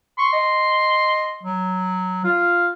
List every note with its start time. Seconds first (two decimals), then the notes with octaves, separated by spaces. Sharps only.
0.18 C6 C#6
0.33 D#5
1.43 F#3
2.24 F4 F5